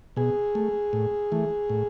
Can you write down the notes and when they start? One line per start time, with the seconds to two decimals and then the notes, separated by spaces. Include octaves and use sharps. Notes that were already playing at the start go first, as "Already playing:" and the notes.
0.16 B2 G#4
0.55 A3
0.93 A2
1.32 E3 A3
1.70 A2